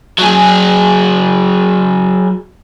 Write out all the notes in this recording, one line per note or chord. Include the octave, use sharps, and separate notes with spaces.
F#3 G#4